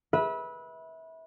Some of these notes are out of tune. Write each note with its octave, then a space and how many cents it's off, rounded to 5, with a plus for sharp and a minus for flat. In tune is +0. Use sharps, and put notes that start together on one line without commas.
B4 -20 E5 -25